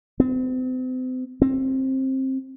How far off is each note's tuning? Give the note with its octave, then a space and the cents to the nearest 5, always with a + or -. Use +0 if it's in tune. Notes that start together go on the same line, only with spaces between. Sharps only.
C4 -40
C4 +20